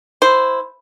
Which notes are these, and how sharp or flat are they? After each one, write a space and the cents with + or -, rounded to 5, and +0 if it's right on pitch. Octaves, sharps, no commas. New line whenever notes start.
E4 +0 C5 -5